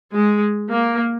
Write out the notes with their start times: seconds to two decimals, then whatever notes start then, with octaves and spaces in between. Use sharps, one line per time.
0.14 G#3
0.72 A#3